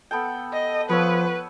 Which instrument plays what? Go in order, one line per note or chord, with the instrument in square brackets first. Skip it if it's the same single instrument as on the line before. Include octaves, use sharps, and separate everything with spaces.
[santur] B3 A4 G5
[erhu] D#5
[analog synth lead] F3 [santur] B3 C#5 E6 [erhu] B4